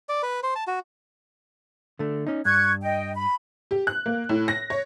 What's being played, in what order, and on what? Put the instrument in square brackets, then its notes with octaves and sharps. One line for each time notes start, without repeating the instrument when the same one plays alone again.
[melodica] D5
B4
C5
A5
F#4
[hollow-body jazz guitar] D3 A3
C#4 D#4
[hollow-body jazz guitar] G2 [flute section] C#6 F#6 G#6
[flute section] D#5 G5
B5
[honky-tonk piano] G4
F#6
A#3
A2
A#6
C#5